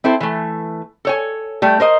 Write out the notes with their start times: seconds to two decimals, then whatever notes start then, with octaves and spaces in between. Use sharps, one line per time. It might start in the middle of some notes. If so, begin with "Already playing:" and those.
0.04 C4 E4 A4 C5
0.21 E3 A3
1.05 A4 C#5 G#5
1.62 G3 A3
1.80 A#4 C5 D#5